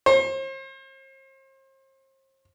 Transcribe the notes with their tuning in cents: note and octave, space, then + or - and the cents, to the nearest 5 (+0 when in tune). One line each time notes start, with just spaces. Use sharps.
C5 +40